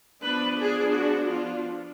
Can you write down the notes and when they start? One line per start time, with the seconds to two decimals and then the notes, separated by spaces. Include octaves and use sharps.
0.22 F3 B3 D4 B4
0.59 G#4
0.94 F#4
1.30 F4